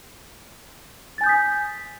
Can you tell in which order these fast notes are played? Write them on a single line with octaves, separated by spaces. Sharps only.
A6 G#5 G6 D#6 B6